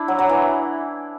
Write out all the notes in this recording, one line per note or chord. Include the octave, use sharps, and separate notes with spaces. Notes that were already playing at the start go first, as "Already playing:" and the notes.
Already playing: D4 E4
F#3
F#3
E3